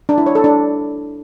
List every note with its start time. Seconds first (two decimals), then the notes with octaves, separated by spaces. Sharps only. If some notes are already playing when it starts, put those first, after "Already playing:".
0.09 D4
0.18 E4
0.26 C#5
0.35 A4
0.44 D4